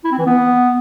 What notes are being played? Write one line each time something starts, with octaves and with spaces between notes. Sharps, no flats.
E4
C4
E3
B3